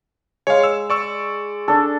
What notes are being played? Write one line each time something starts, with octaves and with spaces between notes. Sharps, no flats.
G#3 C#5 F5
E6
D5 C#6 E6
D4 A4